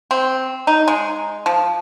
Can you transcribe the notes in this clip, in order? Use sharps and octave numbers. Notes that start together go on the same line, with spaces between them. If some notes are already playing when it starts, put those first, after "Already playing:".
C4
D#4
G#3
F3